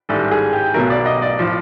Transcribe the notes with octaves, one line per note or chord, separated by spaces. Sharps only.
A1 G#2 D#3 G3 A4
G#4
G4
B1 B2 F#3 A3 A#4
D5
D#5
D5
A2 F3